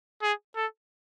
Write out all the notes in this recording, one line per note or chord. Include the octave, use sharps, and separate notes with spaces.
G#4
A4